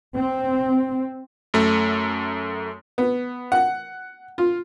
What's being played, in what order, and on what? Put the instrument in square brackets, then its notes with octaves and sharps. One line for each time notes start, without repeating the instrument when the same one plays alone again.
[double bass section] C4
[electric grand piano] F#2 A3
[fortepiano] B3
F#5
F4